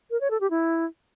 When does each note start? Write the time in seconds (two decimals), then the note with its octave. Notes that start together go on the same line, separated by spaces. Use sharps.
0.11 A#4
0.20 C#5
0.30 A4
0.40 G4
0.50 E4